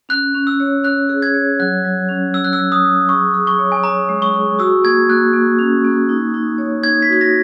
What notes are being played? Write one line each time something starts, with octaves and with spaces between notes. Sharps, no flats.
C#4 F#6
C#4
E6
C#5
C#4 F#6
G#4
G#6
C#5
F#3 F#6
F#3
C#4
C#4 E6
F#6
E6
F#3
D#6
F#3
G#4 C#6
G#4
C#6
C#5
G#5
C#5 A#5
G#3
C#6
G#4
F#4 E6
A#3 G#6
A#3 F#6
A#3
C#4
A#3
D#4
D#4
C#5
D#4 G#6
B6
F#4 G#6
A#6